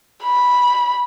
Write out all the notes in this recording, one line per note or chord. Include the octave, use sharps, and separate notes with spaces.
B5